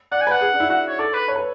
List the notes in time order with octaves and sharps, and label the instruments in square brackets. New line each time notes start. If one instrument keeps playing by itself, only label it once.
[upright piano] D5 [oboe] F#5
[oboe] G#5
[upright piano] B4
[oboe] F#5
[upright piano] G#4
D4
E4
[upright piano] F#4 [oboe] F#5
[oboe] C#5
[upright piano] A4 [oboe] D5
[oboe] B4
[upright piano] C#5
B4